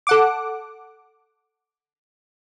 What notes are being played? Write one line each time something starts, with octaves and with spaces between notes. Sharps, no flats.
A4 F#5 D6